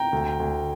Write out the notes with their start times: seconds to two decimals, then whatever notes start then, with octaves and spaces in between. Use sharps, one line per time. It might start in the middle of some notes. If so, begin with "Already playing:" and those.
Already playing: G5 A#5
0.13 D2
0.40 D2